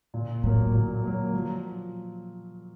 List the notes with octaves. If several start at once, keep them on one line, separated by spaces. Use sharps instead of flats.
A#2
A2 F#3 A#3
A#2
F#3 A#3
F3